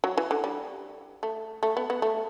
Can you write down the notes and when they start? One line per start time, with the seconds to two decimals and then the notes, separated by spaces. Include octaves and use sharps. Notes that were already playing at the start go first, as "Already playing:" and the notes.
0.04 F#3
0.18 E3
0.31 D3
0.44 G3
1.23 A3
1.63 A3
1.77 B3
1.90 B3
2.02 A3